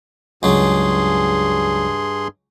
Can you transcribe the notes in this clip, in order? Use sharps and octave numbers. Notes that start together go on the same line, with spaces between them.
C#2 G2 F#3 G#4 C6